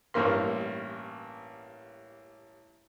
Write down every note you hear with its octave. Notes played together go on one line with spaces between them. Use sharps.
A1 G2 A#3 C6